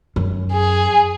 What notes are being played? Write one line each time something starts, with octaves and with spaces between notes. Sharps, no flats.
F#2
G#4